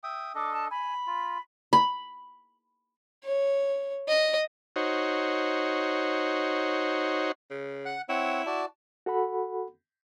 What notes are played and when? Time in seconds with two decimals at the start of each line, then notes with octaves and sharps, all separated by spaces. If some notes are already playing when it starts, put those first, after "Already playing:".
0.03 E5 G5 D#6
0.35 D4 A4 D#5 D6
0.53 A5
0.71 G#5 B5
1.07 F4
1.73 B5
3.24 C#5
4.08 D#5
4.76 D#4 F#4 C5 C#5
7.51 C#3
7.86 F#5 F#6
8.09 C4 E4 C#5 F#5
8.46 F#4 D5 A5
9.06 F#4 A4 F#5 B5